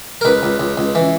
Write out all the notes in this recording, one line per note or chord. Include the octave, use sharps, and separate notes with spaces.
A#4
C#2 B4
C#2
C#2
C#2
E3